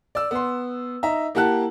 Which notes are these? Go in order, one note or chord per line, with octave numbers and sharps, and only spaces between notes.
D5 E6
B3 C6
D#4 E5 A#5
A#3 E4 G4 F#5 A5 F#6